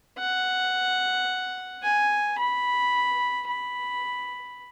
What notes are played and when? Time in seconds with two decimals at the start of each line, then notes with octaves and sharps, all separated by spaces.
0.18 F#5
1.83 G#5
2.38 B5
3.48 B5